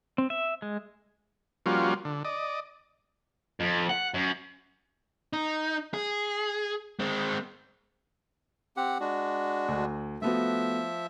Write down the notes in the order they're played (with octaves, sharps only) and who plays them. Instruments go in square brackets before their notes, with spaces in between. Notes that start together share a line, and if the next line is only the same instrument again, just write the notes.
[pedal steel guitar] C4
E5
G#3
[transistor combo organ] F3 G3 A#3 C#4 F4 F#4
D3
D5 D#5
[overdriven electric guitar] F2
F#5
F#2
[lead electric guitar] D#4
G#4
G#3 C4
[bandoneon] C4 G4 F#5
G#3 D4 F#4
[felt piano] D2
[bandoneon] F3 E5 [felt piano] A3 B3 F#4